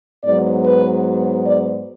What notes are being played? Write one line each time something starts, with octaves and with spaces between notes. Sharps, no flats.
G#2 F#3 B3 D5
B4
D5